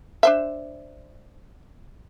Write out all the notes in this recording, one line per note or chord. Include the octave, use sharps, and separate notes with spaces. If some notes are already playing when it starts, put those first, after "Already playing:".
D4 C5 E5